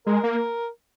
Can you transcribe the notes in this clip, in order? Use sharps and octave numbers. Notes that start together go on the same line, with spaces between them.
G#3 A#4
A#3